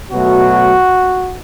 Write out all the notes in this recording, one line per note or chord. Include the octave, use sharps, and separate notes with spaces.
B2 F#3 A3 F#4